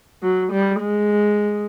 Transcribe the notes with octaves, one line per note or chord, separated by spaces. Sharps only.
F#3
G3
G#3